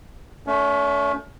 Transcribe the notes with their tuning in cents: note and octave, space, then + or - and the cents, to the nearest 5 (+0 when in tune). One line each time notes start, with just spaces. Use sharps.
A3 +0 C#4 +40